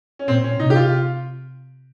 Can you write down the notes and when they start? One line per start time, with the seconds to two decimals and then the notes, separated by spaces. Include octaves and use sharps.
0.19 C#4
0.28 A#2 C4
0.44 C#4
0.59 C3 D#4
0.70 G4
0.76 F4